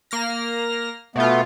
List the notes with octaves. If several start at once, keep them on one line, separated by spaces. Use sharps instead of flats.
A#3 F6 A#6
B2 A3 B3 F4